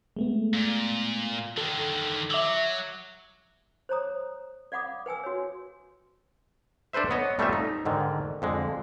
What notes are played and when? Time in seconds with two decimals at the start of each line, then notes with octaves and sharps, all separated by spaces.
0.16 G#3 A3 B3
0.54 A#2
1.58 D3 D#3 A4
2.31 F#3 E5 D6 E6
3.89 C5 C#5 A#5 D#6
4.72 D5 F5 F#5 B5 D6 D#6
5.06 B4 G5 G#5 E6
5.24 F#4 C#5
6.93 D4 A4 B4 C5 E5
7.11 B3 C#5 D#5
7.39 G3 A3 C4 C#4 F4 E5
7.53 D#4
7.85 G#2 D3 D#3
8.42 F2 D3 G#3